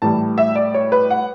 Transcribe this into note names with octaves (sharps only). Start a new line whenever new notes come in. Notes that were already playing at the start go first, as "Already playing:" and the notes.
A2 E3 G3 A5
E5
D5
C#5
B4
F#5